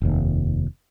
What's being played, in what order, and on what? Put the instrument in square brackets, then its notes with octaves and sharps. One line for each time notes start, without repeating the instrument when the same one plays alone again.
[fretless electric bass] F1 D#2